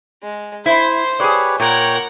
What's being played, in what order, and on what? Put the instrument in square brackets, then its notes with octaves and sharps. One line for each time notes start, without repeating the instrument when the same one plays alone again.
[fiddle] G#3
[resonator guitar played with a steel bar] E4 [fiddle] C5 C6
[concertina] G4 B4 C#5 [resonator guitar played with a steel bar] G#4 D5
[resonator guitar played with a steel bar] A#2 [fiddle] A#4 F#5 [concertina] C#5 G5